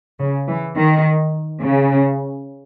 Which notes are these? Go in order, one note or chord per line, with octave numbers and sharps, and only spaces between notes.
C#3
E3
D#3
C#3